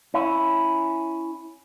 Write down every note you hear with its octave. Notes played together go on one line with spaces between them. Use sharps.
C#4 E4